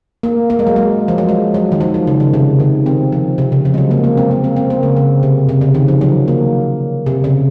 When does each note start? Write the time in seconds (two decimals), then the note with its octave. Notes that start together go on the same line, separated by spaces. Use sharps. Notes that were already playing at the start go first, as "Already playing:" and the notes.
0.23 A#3
0.50 A#3
0.59 G#3
0.67 F#3
0.76 G#3
1.08 F3
1.18 F#3
1.29 G#3
1.54 F#3
1.72 D#3
1.81 F3
1.94 D#3
2.07 C#3
2.20 C#3
2.34 C3
2.60 D#3
2.86 C4
3.12 F3
3.38 C3
3.52 C#3
3.65 F3
3.74 G#3
3.78 F#3
3.91 A#3
4.04 A#3
4.17 C4
4.31 A#3
4.44 C4
4.56 C4
4.70 A#3
4.83 C#3
4.96 C#3
5.23 C3
5.49 C3
5.61 C#3
5.75 D#3
5.88 F3
6.01 F#3
6.28 A#3
7.06 C3
7.24 C#3